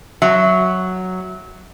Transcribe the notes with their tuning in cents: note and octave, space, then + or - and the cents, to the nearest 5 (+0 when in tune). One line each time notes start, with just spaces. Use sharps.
F#3 +0 E5 +0